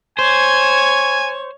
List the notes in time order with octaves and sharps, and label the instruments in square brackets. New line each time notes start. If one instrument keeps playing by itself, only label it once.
[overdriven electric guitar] C5 [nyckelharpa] C#5 C#6 [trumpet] G#5